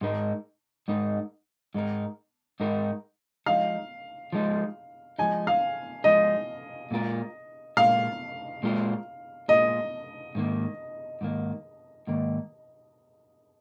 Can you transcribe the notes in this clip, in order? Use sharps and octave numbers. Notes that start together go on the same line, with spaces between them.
G#2 G#3 D#4 A#4
G#2 G#3 D#4 A#4
G#2 G#3 D#4 A#4
G#2 G#3 D#4 A#4
F3 G#3 D#4 F5
F3 G#3 D#4
F3 G#3 D#4 G#5
F5
F3 G#3 D#4 D#5
A#2 G#3 F4 A#4
A#2 G#3 F4 A#4 F5
A#2 G#3 F4 A#4
A#2 G#3 F4 A#4 D#5
G#2 D#3 A#3
G#2 D#3 A#3
G#2 D#3 A#3